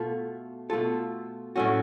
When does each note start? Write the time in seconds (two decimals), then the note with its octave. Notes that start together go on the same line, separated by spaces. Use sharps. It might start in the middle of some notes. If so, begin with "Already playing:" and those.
Already playing: B2 A3 F4 A4
0.70 B2 A3 F4 A4
1.56 A2 F#3 A3 C#4 F#4